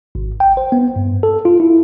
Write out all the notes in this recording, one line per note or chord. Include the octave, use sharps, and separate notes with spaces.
G#1
G5
C5
B3
G2
A4
F4
E4